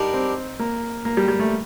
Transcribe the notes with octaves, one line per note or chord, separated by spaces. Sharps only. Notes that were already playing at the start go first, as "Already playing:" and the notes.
Already playing: G3 D4 D#4 G4 A#4
C4
A#3
A#3
G3
G3
A3